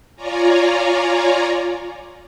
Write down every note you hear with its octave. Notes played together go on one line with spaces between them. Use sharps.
F4 C#5 D5 G#5 A#5